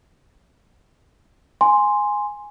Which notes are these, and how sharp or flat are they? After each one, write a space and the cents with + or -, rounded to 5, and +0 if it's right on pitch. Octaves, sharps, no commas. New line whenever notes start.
G#5 +0 C6 +0